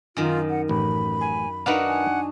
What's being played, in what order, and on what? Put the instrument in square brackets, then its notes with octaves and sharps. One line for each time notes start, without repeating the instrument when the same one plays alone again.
[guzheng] F#2 D#3 [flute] F4
[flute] F#5
[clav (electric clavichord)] A1 [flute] B5
[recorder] G#5
[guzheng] D4 D#4 F#4 [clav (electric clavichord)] A#4 B4 F5 [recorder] F#5
[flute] G#5